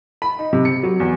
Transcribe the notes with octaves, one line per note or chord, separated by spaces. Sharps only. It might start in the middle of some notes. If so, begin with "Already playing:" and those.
B5
D#4
C3
C#7
F#3
E2